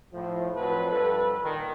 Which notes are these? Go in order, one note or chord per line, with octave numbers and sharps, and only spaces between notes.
A2 F3
F2 F3 F#3 A4 B4
G2 A4 B4
A#2 D#3